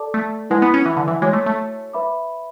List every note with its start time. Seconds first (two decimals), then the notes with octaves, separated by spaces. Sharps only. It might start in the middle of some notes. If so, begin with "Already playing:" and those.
Already playing: A4 D5 A5 D6
0.14 A3
0.50 G#3 E4 B4 F#5 A5
0.62 B3
0.74 C#4
0.86 E3
0.97 D3
1.08 E3
1.22 G#3 F#4 C#5 G#5 D6
1.33 A3
1.46 A3
1.93 B4 E5 B5 D6